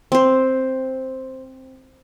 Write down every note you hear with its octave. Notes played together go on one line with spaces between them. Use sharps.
C4 C5